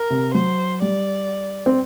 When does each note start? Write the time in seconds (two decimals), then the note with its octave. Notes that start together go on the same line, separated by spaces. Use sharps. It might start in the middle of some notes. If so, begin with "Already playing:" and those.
Already playing: A#4
0.10 C3
0.34 F#3 C5
0.82 G3 D5
1.66 C4